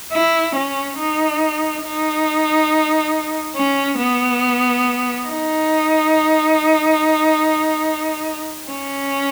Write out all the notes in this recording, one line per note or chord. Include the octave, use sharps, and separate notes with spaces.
E4
C#4
D#4
D#4
C#4
B3
D#4
C#4